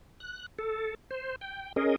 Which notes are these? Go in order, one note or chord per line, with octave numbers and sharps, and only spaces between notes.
F#6
A4
C5
G5
C#4 G#4 A#4 D#5